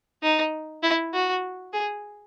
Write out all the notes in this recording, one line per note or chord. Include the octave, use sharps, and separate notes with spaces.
D#4
E4
F#4
G#4